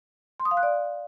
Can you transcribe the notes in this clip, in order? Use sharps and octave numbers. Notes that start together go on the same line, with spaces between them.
C6
D#6
F5
F#6
D5